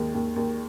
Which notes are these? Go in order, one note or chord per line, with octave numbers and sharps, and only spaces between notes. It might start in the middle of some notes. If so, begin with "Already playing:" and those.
Already playing: D#2 D#3 G#3
D#2
D#2